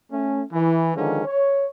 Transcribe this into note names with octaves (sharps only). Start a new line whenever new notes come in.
A3 C#4
E3
D3 D#3 F3 G#3 C#4
C#5